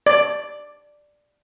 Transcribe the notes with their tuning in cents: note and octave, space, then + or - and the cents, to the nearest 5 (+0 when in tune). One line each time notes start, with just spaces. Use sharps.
D5 +5